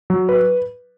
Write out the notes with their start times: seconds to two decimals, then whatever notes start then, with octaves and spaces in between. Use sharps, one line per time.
0.10 F#3
0.29 B4